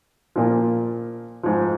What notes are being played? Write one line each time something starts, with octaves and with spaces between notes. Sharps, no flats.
A#2 F3
G#2 F3